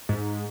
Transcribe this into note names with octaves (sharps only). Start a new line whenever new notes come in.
G#2